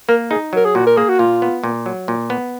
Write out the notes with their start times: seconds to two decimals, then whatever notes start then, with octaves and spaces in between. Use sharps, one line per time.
0.09 A#3 A#4
0.31 D#4 G#4
0.53 F#3 A#4
0.65 G#4
0.75 A#2 F#4
0.87 A#4
0.97 A#3 G#4
1.09 F#4
1.19 A#2 F4
1.42 B3
1.64 A#2
1.86 F#3
2.08 A#2
2.30 B3